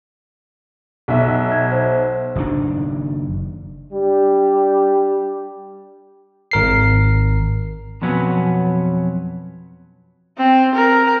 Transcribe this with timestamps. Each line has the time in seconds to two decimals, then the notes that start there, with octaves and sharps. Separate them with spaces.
1.08 B1 E5
1.52 G#6
1.72 C5
2.36 F#1 D#3 D4
3.93 G3 D4 G4
6.51 G#1 A#4 C7
8.02 F2 B2 F#3 B3 C#4
10.37 C4
10.75 A#4